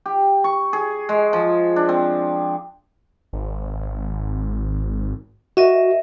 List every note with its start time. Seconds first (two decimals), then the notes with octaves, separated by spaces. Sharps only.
0.06 G4
0.44 C#6
0.73 G#4
1.09 G#3
1.33 F3
1.76 D4
1.89 C4
3.33 G#1
5.57 F#4 A#4 D#5 E5